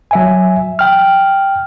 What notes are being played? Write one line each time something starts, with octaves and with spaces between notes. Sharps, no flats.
F#3 E5 G#5
G5 F6